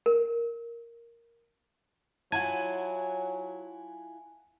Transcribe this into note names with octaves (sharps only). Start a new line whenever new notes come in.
A#4
F#3 E4 F4 F#5 G#5 A5